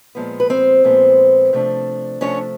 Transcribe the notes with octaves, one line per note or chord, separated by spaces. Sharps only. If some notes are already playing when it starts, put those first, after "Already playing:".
A#2 F3 G#3 B3
B4
C4 C5
A#2 F3 G#3 B3
C3 F3 A3 D4
C3 F3 A3 C#4 D4 C#5